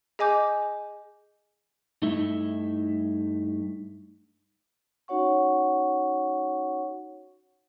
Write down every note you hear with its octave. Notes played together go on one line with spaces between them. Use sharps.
G#4 D#5 G#5 D6 G6
G2 A3 D#4 E4 E5
C#4 D#4 F#4 C#5 F#5 C#6